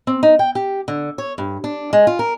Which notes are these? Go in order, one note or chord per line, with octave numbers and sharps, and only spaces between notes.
C4
D#4
G5
G4
D3
C#5
G2
D4
G#3
F4
A#4